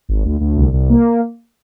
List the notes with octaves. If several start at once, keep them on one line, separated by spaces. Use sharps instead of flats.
G#1
D2
D2
C2
C2
A#3